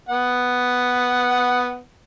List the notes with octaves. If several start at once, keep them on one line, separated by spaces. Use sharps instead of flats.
B3 F#5